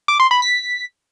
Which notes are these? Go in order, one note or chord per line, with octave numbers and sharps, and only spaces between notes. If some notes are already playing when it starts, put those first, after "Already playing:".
D6
C6
B5
B6